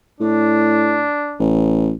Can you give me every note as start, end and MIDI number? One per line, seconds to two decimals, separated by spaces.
0.21 1.05 45
0.21 1.41 62
1.39 1.93 33